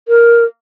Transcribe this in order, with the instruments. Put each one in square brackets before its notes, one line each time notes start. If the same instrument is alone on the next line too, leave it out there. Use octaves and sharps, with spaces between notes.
[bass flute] A#4